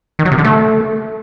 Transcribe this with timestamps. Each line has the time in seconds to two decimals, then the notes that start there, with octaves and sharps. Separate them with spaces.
0.19 D#3
0.25 F#3
0.32 C3
0.38 D3
0.44 A3